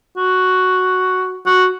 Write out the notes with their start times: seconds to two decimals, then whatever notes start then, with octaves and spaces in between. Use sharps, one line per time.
0.17 F#4
1.46 F#4